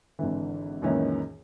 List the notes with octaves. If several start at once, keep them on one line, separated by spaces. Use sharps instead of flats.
G#1 D3 E3
C#2 F#2 A#2 D#3 E3 C#4